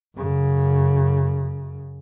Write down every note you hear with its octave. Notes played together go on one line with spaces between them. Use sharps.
F#2 C#3